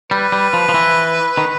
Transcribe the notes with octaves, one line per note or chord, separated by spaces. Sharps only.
G3 B4
G3
F3
F3
E3
D#3